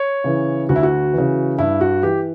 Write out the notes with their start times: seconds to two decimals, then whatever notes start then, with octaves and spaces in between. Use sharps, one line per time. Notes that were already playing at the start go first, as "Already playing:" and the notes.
Already playing: C#5
0.24 C#3 E3
0.69 D2 F#4
0.76 E4
0.83 F#4
1.13 C#3 E3
1.59 G2 E4
1.81 F#4
2.03 E3 G4